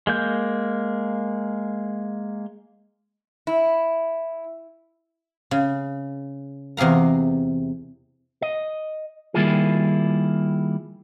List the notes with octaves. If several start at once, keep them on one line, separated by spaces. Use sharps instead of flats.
G#3 A#3 G6
E4
C#3
E2 C3 G#4 F5 A#5
D#5
D#3 G3 A#3 E4 F4 G#4